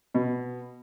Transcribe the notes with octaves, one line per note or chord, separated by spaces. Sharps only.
B2